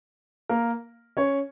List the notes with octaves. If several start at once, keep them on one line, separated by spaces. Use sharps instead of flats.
A#3 A#4
C#4 C#5